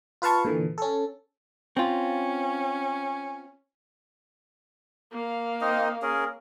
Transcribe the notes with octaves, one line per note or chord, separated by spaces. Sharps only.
F4 B4 F5 A5 C#6
A#2 D3 E3
C#4 A4
C4 C#4 F4
A#3 F5
C4 D#4 D#5
C#4 G#4 A#4